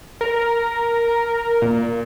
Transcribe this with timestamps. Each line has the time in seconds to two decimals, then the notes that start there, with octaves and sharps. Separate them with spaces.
0.21 A#4
1.62 A#2